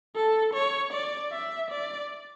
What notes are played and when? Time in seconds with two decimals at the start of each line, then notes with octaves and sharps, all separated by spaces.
0.16 A4
0.54 C#5
0.93 D5
1.32 E5
1.71 D5